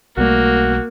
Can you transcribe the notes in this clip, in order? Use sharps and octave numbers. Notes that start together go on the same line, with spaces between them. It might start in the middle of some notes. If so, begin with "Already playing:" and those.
B1 G3 A3 A#3 F#4